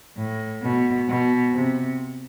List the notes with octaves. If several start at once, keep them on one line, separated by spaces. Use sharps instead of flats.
A2
B2
B2
C3